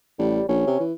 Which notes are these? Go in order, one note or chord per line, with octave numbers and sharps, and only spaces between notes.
A1 G3
A#1 C#4
C3
E3